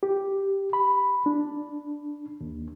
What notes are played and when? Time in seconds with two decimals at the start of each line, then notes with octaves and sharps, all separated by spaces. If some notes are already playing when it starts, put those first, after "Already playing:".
0.03 G4
0.73 B5
1.26 D4
2.41 D#2